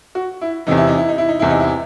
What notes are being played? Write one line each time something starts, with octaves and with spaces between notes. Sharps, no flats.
F#4
E4
E2 C3 E3 D#4
E4
D#4
E4
D#4
E4
D#4
E2 C3 E3 E4
D#4
E4